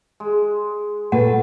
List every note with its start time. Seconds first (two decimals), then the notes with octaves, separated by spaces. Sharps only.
0.20 G#3
1.12 A#2 A3 B4 F#5